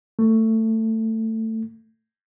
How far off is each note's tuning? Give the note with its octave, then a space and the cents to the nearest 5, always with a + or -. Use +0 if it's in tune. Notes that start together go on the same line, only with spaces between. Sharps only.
A3 +20